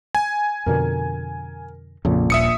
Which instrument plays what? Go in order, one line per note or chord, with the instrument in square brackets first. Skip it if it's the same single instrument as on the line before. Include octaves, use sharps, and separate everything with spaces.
[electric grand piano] G#5
[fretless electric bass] F2 B2 D3 [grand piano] A#4
[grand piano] A#1 [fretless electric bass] F2 C#3
[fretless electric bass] D#1 [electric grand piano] E5 D#6 C#7